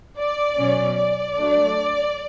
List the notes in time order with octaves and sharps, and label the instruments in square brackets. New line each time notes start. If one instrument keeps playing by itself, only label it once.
[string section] D5
B2 F#3 C#4
D5
F#3 A3 D4